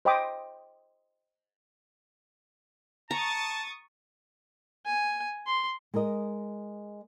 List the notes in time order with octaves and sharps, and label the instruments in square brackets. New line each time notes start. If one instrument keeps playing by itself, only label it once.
[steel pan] C5 D#5 G5 B5 D6 D#6
[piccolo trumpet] A5 [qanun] A#5 [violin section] C#6 D#6 A6
[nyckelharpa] G#5
C6
[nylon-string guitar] G#3 G#4 A#4 D#5